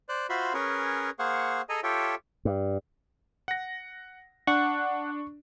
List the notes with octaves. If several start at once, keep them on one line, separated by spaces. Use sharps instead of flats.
C5 D5 F#6
F4 F#4 C5 E5 B5 C6
C#4 G#4 A#4 B4 C#5
A#3 G#4 C5 F5 F#5 C#6
G#4 A4 D#5 G#5 A#5
F4 G4 A4 C#5 E5 G5
G2
F#5 A#6
D4 F#5 C#6